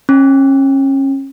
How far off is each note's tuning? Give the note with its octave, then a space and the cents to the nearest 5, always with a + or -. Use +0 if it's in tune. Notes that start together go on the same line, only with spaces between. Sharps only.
C#4 -30